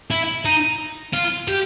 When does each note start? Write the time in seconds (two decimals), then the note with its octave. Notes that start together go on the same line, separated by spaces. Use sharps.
0.11 E4
0.45 D#4
1.13 F4
1.48 G4